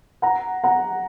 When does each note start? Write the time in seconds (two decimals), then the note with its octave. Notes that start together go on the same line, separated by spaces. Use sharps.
0.22 F#5 A#5
0.64 F#5 A#5